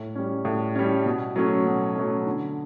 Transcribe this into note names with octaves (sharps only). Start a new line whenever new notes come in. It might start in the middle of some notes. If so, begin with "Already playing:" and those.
Already playing: A2
G3 C#4
A2
G3 C#4
B2
F#3 A3 C#4
B2
F#3 A3 C#4
D3